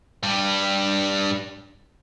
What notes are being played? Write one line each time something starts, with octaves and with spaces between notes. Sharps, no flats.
G2 G3